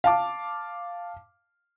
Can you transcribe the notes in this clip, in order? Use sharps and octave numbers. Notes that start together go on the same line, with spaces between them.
F5 A5 D6